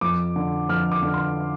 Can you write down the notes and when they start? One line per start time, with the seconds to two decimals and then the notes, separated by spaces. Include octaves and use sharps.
0.01 F2 D6
0.36 D3
0.69 F2 F6
0.92 D6
1.03 D3
1.14 C6